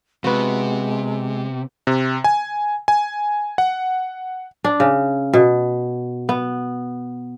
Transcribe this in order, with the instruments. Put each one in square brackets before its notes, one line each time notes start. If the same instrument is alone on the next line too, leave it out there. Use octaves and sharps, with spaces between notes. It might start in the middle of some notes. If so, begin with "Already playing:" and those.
[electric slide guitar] C3 [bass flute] G#3 [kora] B3 F#4
[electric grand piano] C3
G#5
G#5
F#5
[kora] D4
C#3
B2
B3